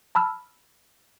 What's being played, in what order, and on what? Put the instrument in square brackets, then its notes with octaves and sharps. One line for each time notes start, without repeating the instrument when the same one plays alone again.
[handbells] A5 B5 E6 F6